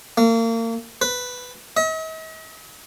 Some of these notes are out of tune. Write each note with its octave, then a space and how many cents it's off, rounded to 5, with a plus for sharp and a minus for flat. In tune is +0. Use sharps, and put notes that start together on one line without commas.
A#3 -35
B4 +5
D#5 +45